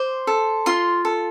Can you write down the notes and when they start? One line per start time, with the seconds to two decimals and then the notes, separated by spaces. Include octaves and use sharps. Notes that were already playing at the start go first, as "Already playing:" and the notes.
Already playing: C5 D6
0.27 A4
0.66 F4 C6
1.05 A4